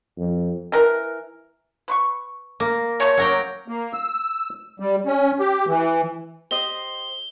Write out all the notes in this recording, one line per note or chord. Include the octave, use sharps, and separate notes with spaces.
F2
E3 A#4
B4 C6 C#6
A#3
G#3 A3 A4 C#5
F#3 C#4 G4 A#4 G5
A#3
E6
G3
C#4
G4
E3
G4 C5 D#5 G7